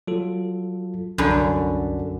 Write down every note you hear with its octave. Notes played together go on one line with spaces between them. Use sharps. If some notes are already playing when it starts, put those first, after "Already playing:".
F#3 F4 A4
C2 F#2 D3 A4 B4 D5